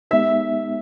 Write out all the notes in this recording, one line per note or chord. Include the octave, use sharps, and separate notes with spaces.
G#3 B3 D#4 G4 E5